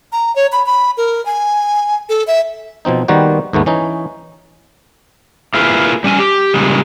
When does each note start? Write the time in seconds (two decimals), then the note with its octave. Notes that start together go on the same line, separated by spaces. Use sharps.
0.12 A#5
0.36 C#5
0.52 B5
0.66 B5
0.97 A#4
1.26 G#5
2.09 A4
2.27 E5
2.85 B2 F3 C4 D#4
3.08 D#3 G3 A#3 B3 F#4 C5
3.53 D#2 G#2 A3 B3
3.66 E3 C#4 D#4
5.54 A#3 E4 F4 G#4 A#4 B4
6.04 G3 C#4 G#5
6.19 G4
6.54 A#2 C#3 G3 G#3